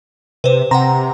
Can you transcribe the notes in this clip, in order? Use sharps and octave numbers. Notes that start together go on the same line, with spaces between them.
C3 B4 C5
C3 F#5 G5 A#5 C6